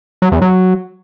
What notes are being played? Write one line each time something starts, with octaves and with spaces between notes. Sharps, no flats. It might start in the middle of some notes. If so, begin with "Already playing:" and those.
F#3
E2
F#3